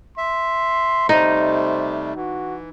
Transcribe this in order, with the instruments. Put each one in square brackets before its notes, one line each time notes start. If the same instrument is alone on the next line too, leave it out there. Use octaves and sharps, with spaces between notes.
[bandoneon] E5 [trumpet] C6
[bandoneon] C3 G3 A3 [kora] D#4 [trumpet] C5
[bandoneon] E3 [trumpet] F#4